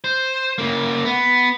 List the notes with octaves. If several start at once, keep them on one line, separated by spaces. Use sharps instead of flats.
C5
C#3 A#3
B3